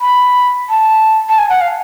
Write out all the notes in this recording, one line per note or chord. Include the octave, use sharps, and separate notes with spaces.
B5
A5
A5
G#5
F#5
F5